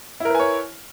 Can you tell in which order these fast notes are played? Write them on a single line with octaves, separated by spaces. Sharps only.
E4 A#4 B4 G#5 C#5